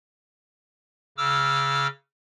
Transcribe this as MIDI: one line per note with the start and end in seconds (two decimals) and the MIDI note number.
1.18 1.87 49
1.18 1.87 86
1.18 1.87 88
1.18 1.87 89